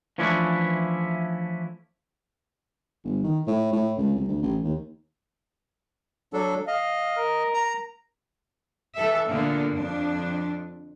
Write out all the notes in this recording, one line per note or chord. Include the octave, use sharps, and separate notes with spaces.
E3 F3 A3 C#4 D4 E4
G1
D#3
A2
A2
C#2
C2
D2
A1
D#2
F#3 D4 A4
D#5 F5
A#4
A#5
E3 A4 E5
A#2 D3 A#3 B3 D4
F2 D4